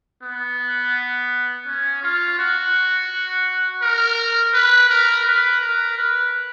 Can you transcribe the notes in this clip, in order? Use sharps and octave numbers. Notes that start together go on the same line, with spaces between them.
B3
C#4
F4
F#4
A#4
B4
A#4
B4
A#4
B4